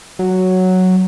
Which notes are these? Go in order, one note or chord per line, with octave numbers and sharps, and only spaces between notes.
F#3